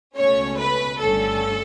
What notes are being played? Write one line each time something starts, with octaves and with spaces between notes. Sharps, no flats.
C#2 B2 A3 C#4 C#5
B4
G1 G2 D3 A3 C#4 A4